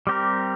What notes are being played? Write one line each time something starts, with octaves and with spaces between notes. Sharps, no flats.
G3 C4 G4 A#4